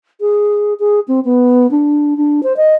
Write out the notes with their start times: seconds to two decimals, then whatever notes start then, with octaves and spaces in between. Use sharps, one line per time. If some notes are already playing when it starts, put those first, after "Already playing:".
0.21 G#4
0.79 G#4
1.08 C4
1.25 B3
1.71 D4
2.17 D4
2.43 C5
2.57 D#5